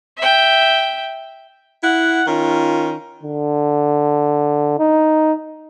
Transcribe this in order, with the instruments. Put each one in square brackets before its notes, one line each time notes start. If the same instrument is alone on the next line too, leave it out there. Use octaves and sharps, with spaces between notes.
[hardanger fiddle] E5 G5
[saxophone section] E4 F#5
D#3 C#4 F4
[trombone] D3
D#4